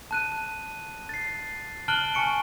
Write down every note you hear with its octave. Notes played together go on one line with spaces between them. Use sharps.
A5 F#6 D#7
A6 C7
A5 F6 F#6 D7 F#7 G7
G#5 A5 C#6 C#7 D7